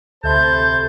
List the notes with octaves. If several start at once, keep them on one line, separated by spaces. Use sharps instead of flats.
D2 C3 A4 C5 E5 A5 B5 G6